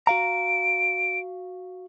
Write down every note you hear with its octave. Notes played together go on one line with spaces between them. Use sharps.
F#4 F5 A#5 D7